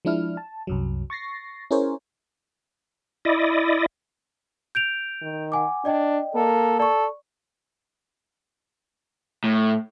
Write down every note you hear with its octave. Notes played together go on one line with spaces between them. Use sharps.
F3 G#3 D4 E4 F6
A5
C2 F#2 F#3
C#6 A6 A#6 C7
C#4 E4 G#4 A#4 C5 C#5
E4 D5 D#5
G6 D7 F7
D#3
F#5 G#5 D6
D4 D5 D#5 G5
A#3 A4
A4 D5 C#6
A2